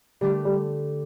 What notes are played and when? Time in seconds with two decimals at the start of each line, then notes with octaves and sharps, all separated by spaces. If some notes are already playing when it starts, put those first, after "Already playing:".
0.21 D3 G3 A3 D4 G4
0.45 G3